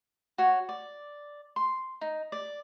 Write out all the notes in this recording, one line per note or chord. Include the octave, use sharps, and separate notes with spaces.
F#4 C#5
D5
C6
D#4
D5